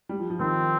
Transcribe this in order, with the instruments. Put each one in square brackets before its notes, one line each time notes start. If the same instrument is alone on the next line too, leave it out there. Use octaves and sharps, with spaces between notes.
[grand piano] G3
F3
F3
[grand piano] D#3 [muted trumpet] C4